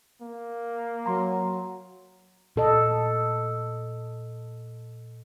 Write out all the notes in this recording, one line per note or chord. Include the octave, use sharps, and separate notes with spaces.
A#3
F#3 A#5 C6
A#2 A4 D#5